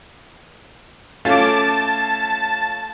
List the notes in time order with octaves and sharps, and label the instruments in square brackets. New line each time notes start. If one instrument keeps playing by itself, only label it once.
[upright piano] A3 C#4 F4 [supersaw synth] A5 D6
[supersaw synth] A5